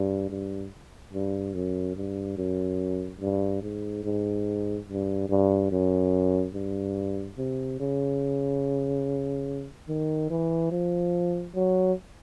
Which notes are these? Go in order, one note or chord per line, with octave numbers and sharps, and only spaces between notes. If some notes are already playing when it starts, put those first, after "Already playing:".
Already playing: G2
G2
G2
F#2
G2
F#2
G2
G#2
G#2
G2
G2
F#2
G2
C3
C#3
D#3
E3
F3
F#3